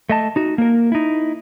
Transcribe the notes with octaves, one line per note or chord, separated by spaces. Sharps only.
A3 D#5 A5
D#4 F#4
A#3 A#4
D#4 E4